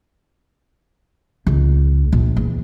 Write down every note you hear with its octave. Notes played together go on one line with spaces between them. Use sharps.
C#2
A#1
E2